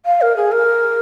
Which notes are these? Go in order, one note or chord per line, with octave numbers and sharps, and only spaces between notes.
F5
A#4
G#4
A#4